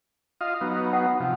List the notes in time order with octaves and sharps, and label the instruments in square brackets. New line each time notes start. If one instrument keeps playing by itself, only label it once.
[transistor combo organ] F4 D#5 F5
F#3 B3 D#4
[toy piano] F#5
[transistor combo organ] C3 F3